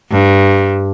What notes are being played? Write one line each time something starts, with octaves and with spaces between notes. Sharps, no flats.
G2